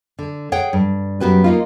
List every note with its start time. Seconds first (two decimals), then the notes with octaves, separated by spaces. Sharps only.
0.19 D3
0.52 G#4 C#5 F#5 G5
0.73 G2
1.20 F#2 B3 F#4 G4 B4
1.44 A#3 D#4 F4